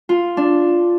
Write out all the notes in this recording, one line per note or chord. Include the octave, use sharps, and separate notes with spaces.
F4
D4